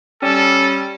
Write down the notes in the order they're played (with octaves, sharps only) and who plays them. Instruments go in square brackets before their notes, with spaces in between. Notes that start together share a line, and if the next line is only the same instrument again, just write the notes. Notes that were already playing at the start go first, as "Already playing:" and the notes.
[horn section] G3 C#4 [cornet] A4